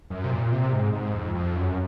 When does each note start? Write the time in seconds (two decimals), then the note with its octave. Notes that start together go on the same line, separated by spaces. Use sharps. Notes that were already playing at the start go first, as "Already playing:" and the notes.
0.10 F#2
0.24 C3
0.30 A#2
0.52 C3
0.72 G#2
0.93 G#2
1.14 F2
1.35 F2
1.56 F#2